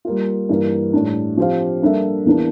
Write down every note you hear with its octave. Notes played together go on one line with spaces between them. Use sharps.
G3 A#3 F4
G2 E3 A#3
A2 G3 D4
F3 C4 G4 C5 F5
G3 A#3 D4 A4 E5
E2 E3 A#3 D4